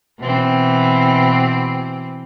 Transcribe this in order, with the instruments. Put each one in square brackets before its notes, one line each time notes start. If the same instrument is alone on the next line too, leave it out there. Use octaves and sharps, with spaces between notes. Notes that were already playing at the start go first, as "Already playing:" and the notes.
[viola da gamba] B2 E3 C4